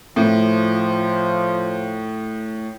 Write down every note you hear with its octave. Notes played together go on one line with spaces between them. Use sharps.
A2 F3